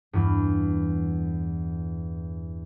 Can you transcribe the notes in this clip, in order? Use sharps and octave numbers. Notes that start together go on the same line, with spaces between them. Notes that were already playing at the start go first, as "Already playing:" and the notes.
E2 G2